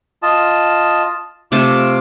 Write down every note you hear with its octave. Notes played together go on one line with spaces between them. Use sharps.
F4 D#5 A5
C3 A3 F4 A5 D6